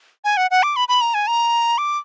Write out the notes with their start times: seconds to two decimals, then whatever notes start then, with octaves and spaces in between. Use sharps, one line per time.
0.24 G#5
0.37 F#5
0.51 F#5
0.63 D6
0.76 B5
0.88 B5
1.01 A#5
1.14 G#5
1.27 A#5
1.78 D6